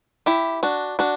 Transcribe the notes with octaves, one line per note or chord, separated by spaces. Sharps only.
E4 G4
D4 F#4
D4 F#4